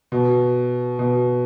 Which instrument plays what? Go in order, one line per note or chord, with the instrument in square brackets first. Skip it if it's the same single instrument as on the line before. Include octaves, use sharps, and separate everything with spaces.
[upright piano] B2
B2